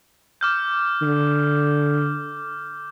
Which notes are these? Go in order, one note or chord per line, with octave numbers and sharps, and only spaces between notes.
D6 F6 G6
D3